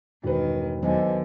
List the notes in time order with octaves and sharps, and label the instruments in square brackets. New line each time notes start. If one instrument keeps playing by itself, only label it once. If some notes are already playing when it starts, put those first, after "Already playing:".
[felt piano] E1 B4 [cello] G2 D#3
[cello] D#2 D3 [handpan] D#3 F#3 B3 [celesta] C5 D#5 G#5